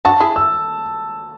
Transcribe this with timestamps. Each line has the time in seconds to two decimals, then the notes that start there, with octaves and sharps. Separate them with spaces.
0.05 D4 F#4 A5
0.20 E4 G#4
0.36 E6